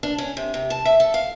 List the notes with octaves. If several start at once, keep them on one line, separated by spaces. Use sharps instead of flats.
D4
C#4
C3
C3
A5
E5
A4
F5